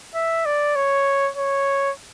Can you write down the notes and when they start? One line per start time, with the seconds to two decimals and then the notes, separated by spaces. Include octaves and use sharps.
0.15 E5
0.45 D5
0.76 C#5
1.37 C#5